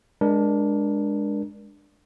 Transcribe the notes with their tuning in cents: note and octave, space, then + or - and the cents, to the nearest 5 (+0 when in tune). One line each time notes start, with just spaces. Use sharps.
G#3 -10 D4 +0 A#4 +30